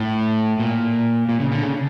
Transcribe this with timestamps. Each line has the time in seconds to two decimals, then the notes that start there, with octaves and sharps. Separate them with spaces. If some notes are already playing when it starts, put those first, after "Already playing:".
Already playing: A2
0.60 A#2
1.29 A#2
1.40 C#3
1.52 D3
1.63 C#3